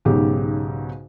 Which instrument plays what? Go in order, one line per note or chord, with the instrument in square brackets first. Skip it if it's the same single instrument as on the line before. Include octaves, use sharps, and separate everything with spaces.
[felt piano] B1 G#2 C#3 G4